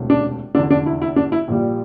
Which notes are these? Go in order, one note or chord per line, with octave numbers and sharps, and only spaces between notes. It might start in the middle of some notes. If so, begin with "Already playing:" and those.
Already playing: E1 D2 C3
D4
F1 E2 D3 D4
D4
E4
E4
D4
E4
A#1 A#2 G3